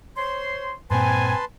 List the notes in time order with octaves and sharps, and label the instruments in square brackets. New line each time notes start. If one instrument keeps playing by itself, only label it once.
[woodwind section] C5 C#5 C6
[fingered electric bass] G2 A#2 [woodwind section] C4 C5 G#5 [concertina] B4 A5 C6